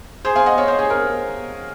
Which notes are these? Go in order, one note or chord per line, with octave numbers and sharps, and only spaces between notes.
G#4 C5
F5 G#5
D#5 F#5
C#5 F5
C5 D#5
G#4 C5
A#4